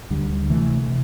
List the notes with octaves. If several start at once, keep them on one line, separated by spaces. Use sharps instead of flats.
D2 D3 G3
C3 E3 A3
C3